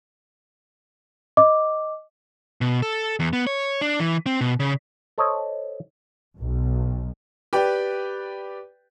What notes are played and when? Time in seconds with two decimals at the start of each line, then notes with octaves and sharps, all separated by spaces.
1.37 D#5 D6
2.61 B2
2.82 A4
3.20 E2
3.33 B3
3.47 C#5
3.81 D4
4.00 E3
4.26 C4
4.41 B2
4.60 C#3
5.18 A4 C5 C#5 D#5
6.40 B1
7.53 G4 B4 D5 G5